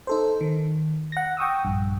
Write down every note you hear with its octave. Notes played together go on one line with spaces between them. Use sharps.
D#4 A4 C5
D#3
F#5 A#6
G5 C#6 D#6 E6
A#1 G2